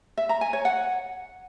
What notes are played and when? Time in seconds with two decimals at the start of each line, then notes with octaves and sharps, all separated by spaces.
0.17 E5
0.29 A#5
0.41 G#5
0.53 C#5
0.65 F#5